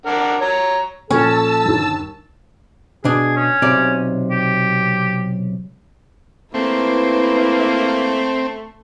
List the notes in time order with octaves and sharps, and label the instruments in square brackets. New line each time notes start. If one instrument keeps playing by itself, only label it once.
[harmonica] D4 A#4 F#5
C#5 A#5
[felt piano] A#2 F3 F6 [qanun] C#4 [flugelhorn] A4 [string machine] A5 E6
[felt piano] G1 D#2
[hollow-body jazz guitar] B2 D4 [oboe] G#4
[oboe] C#4
[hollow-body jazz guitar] B1 C3 D5
[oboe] G4
[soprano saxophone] A3 [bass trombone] A#3 [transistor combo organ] C4 [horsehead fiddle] E4 B4